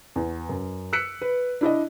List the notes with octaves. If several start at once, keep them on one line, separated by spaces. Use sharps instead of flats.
E2
F#2
E6 F#6 B6 C#7 D7
B4
D4 E4 D5 D#5